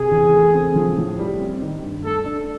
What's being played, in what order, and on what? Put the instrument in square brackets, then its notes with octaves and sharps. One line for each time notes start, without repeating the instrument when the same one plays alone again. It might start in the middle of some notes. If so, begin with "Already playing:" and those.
Already playing: [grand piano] C3 [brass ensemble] G#4
[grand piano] E2
A3
C4
F3
A2
G3
C4
D#3
G2
[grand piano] A3 [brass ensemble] A4
[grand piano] D4